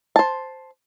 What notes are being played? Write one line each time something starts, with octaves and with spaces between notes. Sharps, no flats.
C5 A5